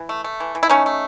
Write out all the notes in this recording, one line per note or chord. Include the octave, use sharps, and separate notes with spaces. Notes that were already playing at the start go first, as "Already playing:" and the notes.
Already playing: E3
A3
A3
E3
E3
E4
A3 C#4 D#4
A3